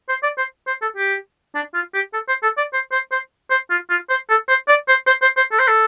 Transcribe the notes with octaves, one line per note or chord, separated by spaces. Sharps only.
C5
D5
C5
C5
A4
G4
D4
F4
G4
A4
C5
A4
D5
C5
C5
C5
C5
F4
F4
C5
A4
C5
D5
C5
C5
C5
C5
A4
C5
A4